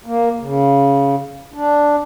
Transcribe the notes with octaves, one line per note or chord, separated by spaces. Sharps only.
A#3
C#3
D4